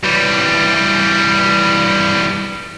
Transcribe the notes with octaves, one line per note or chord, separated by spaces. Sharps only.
E3 G3